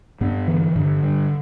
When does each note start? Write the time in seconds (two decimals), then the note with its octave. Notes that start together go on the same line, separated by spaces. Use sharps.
0.21 G2 B3
0.47 D3 E3
0.76 G2 D3
1.03 G2